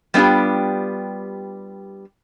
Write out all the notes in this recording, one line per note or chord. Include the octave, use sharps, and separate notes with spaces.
G3 B3 D4 F4 G4